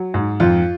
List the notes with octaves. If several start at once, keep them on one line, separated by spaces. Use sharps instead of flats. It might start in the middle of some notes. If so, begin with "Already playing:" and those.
Already playing: F#3
G#2
F2 F4